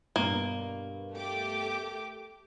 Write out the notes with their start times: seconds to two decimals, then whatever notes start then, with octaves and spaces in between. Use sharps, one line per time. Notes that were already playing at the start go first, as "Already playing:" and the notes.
0.16 G2 B2 A#3 B3
1.14 A3 G4 D6